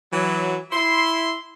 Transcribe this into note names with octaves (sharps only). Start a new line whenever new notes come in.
E3 F#3
E4 C6